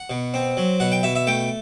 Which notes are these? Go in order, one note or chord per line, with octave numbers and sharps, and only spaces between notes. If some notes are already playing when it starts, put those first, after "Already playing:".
Already playing: F#5
B2
C4
F#3
B2 F#5
G5
B2 E5
E5
A3 G5